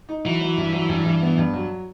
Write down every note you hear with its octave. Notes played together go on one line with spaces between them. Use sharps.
D#4
E3 F#3
F#3
G2
F#3
G2
G2
B3
G2
F#3